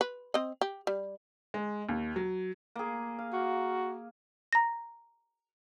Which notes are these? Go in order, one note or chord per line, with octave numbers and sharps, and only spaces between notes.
B4
C4 D#5
G4
G3
G#3
D#2
F#3
A#3 G#4
F5
F#4
A#5 A#6